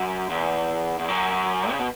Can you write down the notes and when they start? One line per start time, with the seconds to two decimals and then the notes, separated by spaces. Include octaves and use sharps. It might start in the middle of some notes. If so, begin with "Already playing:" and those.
Already playing: F#2
0.30 E2
0.99 E2
1.08 F#2
1.71 C#3
1.79 B2